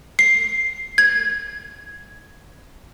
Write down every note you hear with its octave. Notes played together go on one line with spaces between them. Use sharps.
C7
G#6